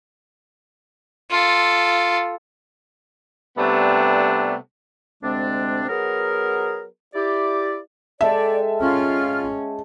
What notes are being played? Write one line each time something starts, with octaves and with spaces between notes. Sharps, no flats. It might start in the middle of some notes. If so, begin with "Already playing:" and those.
F4 A4
C3 G3 A3 B3 D4
D2 C3 G#3 C4 D4
F#3 B3 G#4 A#4
E4 G4 D5
G#3 A4 D5 E5 G5
C#4 F4 F6